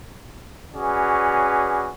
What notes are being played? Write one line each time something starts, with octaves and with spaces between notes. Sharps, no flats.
C#4 F#4 G#4 B4 D5